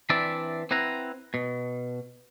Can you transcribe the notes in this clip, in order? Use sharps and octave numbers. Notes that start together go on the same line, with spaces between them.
E3 C4 D4 D5 E5 B5
C4 E4 B4 F#5 A#5
B2